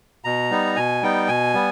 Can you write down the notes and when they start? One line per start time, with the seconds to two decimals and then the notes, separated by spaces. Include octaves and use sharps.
0.24 B2 A#5
0.51 G3 B3 D#4
0.76 B2 G#5
1.03 G3 B3 D#4 G5
1.28 B2 G#5
1.54 G3 B3